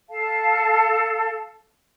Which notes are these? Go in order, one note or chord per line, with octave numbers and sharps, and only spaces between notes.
A4 F5 A5